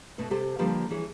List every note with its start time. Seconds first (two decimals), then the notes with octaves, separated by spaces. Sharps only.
0.18 B2 A3 B4
0.30 C3 G4 A4 C5
0.59 D3 F3 G3 A#3 G4 B4
0.91 E3 G#4 C#5